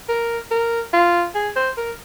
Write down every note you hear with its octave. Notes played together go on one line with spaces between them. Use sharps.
A#4
A#4
F4
G#4
C5
A#4